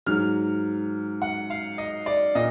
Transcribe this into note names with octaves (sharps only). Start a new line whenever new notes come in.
G#2 F#3 F6
F#5
F5
D#5
D5
A#2 D#5